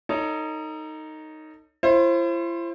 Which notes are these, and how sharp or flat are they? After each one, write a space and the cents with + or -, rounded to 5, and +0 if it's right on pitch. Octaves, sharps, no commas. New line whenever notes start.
D#4 +0 A4 +35 C#5 +15
E4 +45 C5 +25